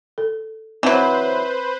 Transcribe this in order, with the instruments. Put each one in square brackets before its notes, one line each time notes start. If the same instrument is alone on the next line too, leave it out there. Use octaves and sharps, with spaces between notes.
[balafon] A4
[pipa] E3 F#3 [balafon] C4 [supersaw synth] B4 C5